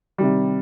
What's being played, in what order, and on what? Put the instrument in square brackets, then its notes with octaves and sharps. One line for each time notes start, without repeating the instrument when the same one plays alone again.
[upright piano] C3 D#3 G3